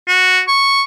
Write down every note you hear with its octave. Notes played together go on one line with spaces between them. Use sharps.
F#4
C#6